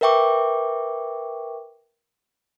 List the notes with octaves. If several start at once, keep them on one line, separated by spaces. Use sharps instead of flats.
A#4 B4 E5 G5 C#6 D6